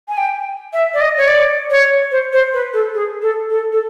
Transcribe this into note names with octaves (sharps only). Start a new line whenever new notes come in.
G#5
G5
E5
D5
D#5
C#5
D5
C#5
C5
C5
B4
A4
G#4
A4
A4
A4